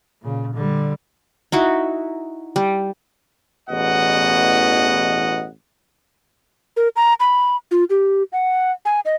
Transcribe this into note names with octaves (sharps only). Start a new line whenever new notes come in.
A#2 C#3
D3 G3
D#4 E4 F#4
G3
A1 E2 B2 D#5 F#5
A#4
A#5
B5
F4
G4
F#5
G#5
D#5